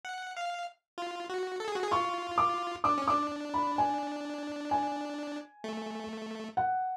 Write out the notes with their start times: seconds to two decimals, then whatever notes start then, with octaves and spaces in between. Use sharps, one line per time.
0.05 F#5
0.37 F5
0.98 F4
1.29 F#4
1.60 A4
1.68 G#4
1.76 F#4
1.83 G#4
1.91 F4 C#6
2.38 D6
2.84 D4 D6
2.98 C#4
3.08 D4 D6
3.54 B5
3.78 G#5
4.71 G#5
5.64 A3
6.57 F#5